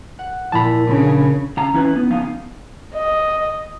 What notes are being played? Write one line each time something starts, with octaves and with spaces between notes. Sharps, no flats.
F#5
A#2 F3 E4 A5 B5
C#3 D4
C#3 A#5
E3 C#4 D#4 E4 B4
B3
C#3 F3 B3 D#4 F5
D#5